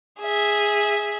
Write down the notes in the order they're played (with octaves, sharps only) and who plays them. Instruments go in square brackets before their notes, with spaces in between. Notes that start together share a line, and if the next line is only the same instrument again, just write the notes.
[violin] G#4 E5